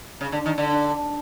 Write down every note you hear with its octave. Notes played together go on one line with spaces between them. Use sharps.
C#3
D3
D#3
D3